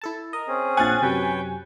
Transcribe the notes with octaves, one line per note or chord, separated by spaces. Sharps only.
E4 A4 A5
A#4 D#5
C4 C#4 G#4
A#1 F5 F#5 G#5 F#6 A6
F#2 C3 B4 C#5 G5